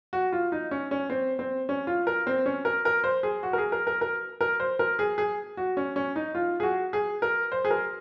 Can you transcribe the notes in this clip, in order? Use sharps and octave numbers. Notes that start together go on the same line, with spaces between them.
F#4
F4
D#4
C#4
C#4
C4
C4
C#4
F4
A#4
C4
C#4
A#4
A#4
C5
G#4
F#4
A#4
G#4
A#4
A#4
A#4
A#4
C5
A#4
G#4
G#4
F#4
C#4
C#4
D#4
F4
G#4
F#4
G#4
A#4
C5
G#4
A#4